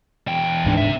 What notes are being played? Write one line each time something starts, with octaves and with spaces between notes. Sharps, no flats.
E2 G5
D1 G#2 D4
C3 E5